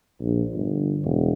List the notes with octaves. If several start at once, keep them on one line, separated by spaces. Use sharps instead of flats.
A#1
G1
E1